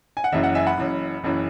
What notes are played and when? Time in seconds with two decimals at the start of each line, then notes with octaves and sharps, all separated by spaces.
0.17 G#5
0.24 F#5
0.32 F#1 F#2 E3 E5
0.43 F#5
0.55 E5 G#5
0.66 F#5 B5
0.78 F#1 F#2 E3
1.24 F#1 F#2 E3